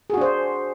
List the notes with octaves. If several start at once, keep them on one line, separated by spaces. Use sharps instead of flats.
D4 F#4 G#4 C5